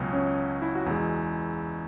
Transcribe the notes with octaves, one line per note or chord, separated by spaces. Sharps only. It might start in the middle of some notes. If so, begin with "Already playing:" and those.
Already playing: C#2 B2 F#3 C#4
C#4
E4
F#4
E2 B2 G#3 E4